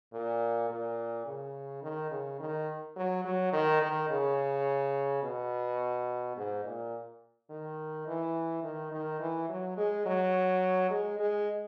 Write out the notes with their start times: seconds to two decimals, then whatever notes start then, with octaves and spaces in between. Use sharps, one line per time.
0.13 A#2
0.69 A#2
1.26 C#3
1.83 D#3
2.11 C#3
2.40 D#3
2.96 F#3
3.24 F#3
3.52 D#3
3.81 D#3
4.09 C#3
5.23 B2
6.37 G#2
6.64 A#2
7.50 D#3
8.07 E3
8.63 D#3
8.92 D#3
9.20 E3
9.49 F#3
9.77 G#3
10.06 F#3
10.90 G#3
11.19 G#3